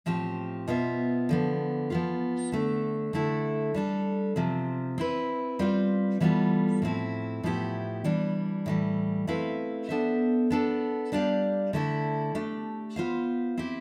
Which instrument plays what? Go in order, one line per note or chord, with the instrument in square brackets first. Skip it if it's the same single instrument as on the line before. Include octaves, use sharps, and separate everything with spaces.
[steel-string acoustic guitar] A2 F3 C4 G4
B2 B3 F4 C5 E5
D3 F3 B3
F3 B3 F4
D3 A3 D4
D3 A3 E4 A4
G3 D4 A4
C3 F3 C4
C4 E4 B4
G3 C4 F4 B4 F5
E3 G3 B3 F4 A4
A2 F3 C4 E4
A2 F3 B3 E4 G4
E3 G3 D4
A2 E3 G3
A3 C4 E4 B4 F5
B3 D4 A4 C5 E5
B3 D4 A4
G3 D4 G4 D5 F5
D3 A3 E4 A4
A3 D4 G4
B3 F4 C5 F5
C4 E4 G4